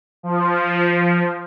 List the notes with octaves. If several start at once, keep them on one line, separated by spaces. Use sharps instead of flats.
F3